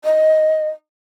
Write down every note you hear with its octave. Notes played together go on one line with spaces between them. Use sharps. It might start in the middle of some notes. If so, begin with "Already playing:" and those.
D#5